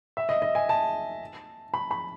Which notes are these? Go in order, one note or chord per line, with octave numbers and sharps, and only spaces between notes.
E5
D#5
D#5
G#5
A5
B5
B5